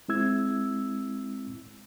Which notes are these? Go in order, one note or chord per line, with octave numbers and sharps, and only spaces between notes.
G#3 C4 E4 E6 G#6